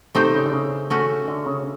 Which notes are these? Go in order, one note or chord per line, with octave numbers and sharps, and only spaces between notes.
C3 A3 C4 D#4 G4 C5
C#3
D3
C#3
A3 C#4 F#4
D3
C#3